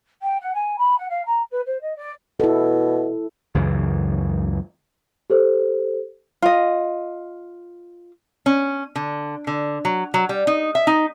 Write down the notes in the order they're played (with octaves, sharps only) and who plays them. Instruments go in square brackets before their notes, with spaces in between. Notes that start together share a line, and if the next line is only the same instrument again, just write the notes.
[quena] G5
F#5
G#5
B5
F#5
F5
A#5
B4
C5
D#5
D5
[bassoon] B2 [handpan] E4 A4
[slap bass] C#2 F#2 C#3 E3
[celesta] G4 A4 C5
[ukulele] F4 D#5
[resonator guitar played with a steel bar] C#4
D3
D3
F#3
F#3
G3
D#4
E5
D#4